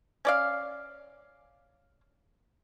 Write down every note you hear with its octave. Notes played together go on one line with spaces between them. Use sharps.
C#4 D5 F5